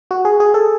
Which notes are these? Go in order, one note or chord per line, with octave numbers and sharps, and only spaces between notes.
F#4
G#4
G#4
A4